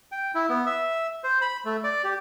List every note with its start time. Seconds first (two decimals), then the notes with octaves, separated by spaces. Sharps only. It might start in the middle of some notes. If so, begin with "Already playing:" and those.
0.12 G5
0.35 E4
0.50 B3
0.66 E5
1.24 C5
1.41 B5
1.65 A3
1.84 D5
2.04 G4